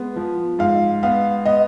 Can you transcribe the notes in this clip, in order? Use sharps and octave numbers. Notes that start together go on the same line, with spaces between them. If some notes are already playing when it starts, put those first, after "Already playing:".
Already playing: G#3 B3
F3
G#2 F5
B3 F5
B3 D#5